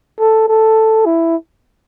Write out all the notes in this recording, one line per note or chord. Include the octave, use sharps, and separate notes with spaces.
A4
A4
E4